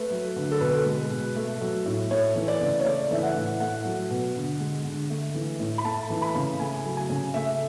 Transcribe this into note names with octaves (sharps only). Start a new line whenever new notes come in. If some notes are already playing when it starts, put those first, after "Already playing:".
Already playing: A3 B4
F#3
D3
A4
B2 B4
G#3
B2
A3
F#3
A2
A3 C#5
E3
D5
C#3
C#5
A3 D5
E3 E5
F#5
A2
A3 F#5
F#3
B2
D3
G#3
D3
A3
E3
A2
B5
A3 A5
E3
B5
C#3
A3 G#5
F#3
G#5
C#3
A3 E5